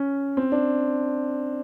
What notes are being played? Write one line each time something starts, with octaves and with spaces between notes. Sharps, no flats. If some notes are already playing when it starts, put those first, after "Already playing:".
Already playing: C#4
C4
D4